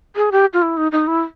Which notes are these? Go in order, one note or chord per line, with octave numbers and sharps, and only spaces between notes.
G#4
G4
F4
E4
D#4
D#4
E4